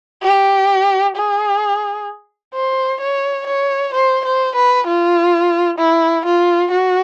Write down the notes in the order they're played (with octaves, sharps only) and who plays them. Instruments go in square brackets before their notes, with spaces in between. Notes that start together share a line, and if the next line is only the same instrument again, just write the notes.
[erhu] G4
G#4
C5
C#5
C#5
C5
C5
B4
F4
E4
F4
F#4